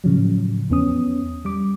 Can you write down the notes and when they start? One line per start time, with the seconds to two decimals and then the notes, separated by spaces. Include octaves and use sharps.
0.04 A2 C#3 F3 F#3
0.70 E2 B3 C#4 D#6
1.45 G3 D6